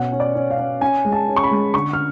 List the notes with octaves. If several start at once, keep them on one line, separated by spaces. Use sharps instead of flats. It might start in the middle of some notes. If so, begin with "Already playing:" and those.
Already playing: B2 C#4 F#5
C#4
D5
C#4
F5
C#4
C#4 G#5
G#3
A5
C#4
C#6
B5
G#3
D3 C#6
F6